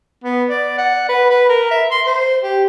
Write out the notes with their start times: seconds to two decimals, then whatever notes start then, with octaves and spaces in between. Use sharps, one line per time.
0.24 B3
0.50 D5
0.78 F#5
1.09 B4
1.30 B4
1.49 A#4
1.71 E5
1.91 C6
2.07 C5
2.43 G4